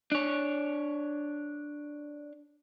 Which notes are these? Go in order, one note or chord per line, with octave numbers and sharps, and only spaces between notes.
D4 C#5